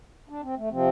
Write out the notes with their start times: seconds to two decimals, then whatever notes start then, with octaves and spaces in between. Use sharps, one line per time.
0.29 D4
0.42 C4
0.57 A3
0.71 C3 F3 C4